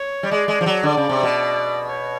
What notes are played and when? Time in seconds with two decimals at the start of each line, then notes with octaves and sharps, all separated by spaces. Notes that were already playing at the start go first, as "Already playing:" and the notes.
Already playing: C#5
0.23 G3
0.31 G#3 D5
0.48 G#3
0.61 F3
0.66 F#3
0.83 D3 D5
0.97 C#3
1.09 C3
1.23 B2
1.89 C#5